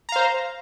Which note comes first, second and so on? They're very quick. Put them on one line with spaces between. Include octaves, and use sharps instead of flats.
A#5 F5 C5